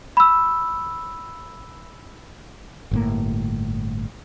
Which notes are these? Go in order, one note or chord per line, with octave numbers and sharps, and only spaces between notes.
B5 E6
G1 A2 A#3